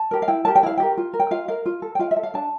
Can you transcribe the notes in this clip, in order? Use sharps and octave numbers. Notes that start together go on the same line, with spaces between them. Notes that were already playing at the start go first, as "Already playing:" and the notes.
Already playing: A5
G4 A#4
F5
E4 G5
G4 A#4 A5
G5
E4 F5
G4 A#4 G5
F4
A#4
G5
F4 F5
A#4 F5
F4
A4
G5
F4 F5
E5
A4
F5
D4 A5